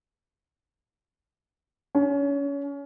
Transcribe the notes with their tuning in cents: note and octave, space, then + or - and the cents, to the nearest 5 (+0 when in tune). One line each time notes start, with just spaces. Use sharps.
C#4 +25